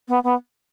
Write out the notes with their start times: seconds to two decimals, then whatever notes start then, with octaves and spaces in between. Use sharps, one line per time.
0.08 B3
0.24 B3